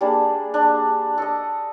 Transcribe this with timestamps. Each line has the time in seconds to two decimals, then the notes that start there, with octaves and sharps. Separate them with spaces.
0.01 G3 A#3 D4 G#4
0.54 D4
1.18 A4 D5 D#5